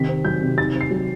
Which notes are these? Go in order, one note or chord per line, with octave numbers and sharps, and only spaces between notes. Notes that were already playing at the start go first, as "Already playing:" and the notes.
Already playing: C3 D#3 B6
C4
F#3 G6
C3
D#4 A6
C4
C7
F#3